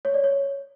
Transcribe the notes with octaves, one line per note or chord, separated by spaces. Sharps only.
C#5
D5
C#5